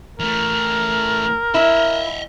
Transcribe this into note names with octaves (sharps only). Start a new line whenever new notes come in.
E3 A3 A#4
E4 D#5 E5